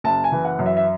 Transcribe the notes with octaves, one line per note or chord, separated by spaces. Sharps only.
F#1 A5
G#5
E3
F#5
F#2
E5
E5